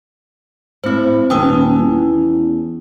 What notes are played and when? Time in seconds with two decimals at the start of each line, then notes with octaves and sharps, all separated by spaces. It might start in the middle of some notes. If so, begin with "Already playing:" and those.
0.84 A2 C4 E4 C5
1.30 D#1 C#4 B4 G5 A5 D#6 E6
1.80 E2